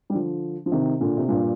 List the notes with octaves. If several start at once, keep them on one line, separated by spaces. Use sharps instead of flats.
G3
D3 F3
F3
C3 D#3
A#2 D3
C3
G2 A#2